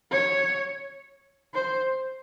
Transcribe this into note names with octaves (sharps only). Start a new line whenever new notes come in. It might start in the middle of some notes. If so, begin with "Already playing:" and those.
C#5
C5